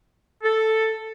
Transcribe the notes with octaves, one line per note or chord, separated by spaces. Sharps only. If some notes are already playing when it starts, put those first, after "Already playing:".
A4